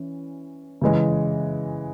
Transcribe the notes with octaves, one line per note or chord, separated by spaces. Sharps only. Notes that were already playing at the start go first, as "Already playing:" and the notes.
Already playing: E3 C#4
C#3 E3 G#3